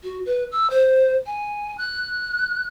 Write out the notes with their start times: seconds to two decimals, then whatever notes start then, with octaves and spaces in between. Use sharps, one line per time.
0.04 F#4
0.26 B4
0.51 E6
0.70 C5
1.26 G#5
1.78 F#6